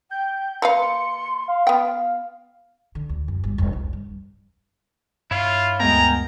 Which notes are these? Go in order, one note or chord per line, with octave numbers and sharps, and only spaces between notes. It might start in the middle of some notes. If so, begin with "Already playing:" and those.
G5 G6
A#3 B4 F5 C6 C#7
F5
B3 G5
D3
D2
F#2
G1
E1
C2
G2
G2 E4 F4 C#5 F5
D2 G#3 B3 A#4 G5 G#5 A#5